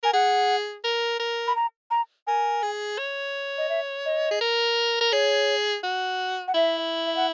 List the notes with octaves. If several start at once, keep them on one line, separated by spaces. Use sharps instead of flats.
A#4 G#5
G#4 F#5
A#4
A#4
B5
A#5
A#5
A#4 G#5
G#4
C#5
D#5
E5
D#5
G#4
A#4
A#4
G#4 C#5
F#4
F#5
E4 E5
E5
F#5